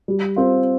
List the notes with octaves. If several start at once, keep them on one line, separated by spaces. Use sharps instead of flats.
G3
C4 F4